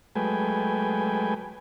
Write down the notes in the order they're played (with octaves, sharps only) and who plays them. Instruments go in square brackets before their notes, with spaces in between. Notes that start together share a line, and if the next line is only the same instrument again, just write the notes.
[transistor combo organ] F#3 G#3 A3 B4 G5 G#5